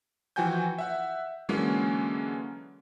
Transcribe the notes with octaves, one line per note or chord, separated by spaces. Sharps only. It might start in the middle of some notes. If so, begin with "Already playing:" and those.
E3 F3 F#4 G5 G#5 G6
E5 F#5
D3 E3 F#3 G#3 A#3 C#4